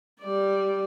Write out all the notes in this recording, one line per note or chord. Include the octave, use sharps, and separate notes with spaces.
G3 D5